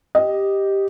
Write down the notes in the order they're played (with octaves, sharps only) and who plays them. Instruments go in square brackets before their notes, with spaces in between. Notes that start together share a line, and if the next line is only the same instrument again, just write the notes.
[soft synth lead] G4 [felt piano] D#5